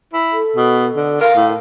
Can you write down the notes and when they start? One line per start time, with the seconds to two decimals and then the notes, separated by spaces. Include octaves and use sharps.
0.13 E4
0.32 A4
0.56 B2
0.96 D3
1.21 A#4 F5
1.36 A2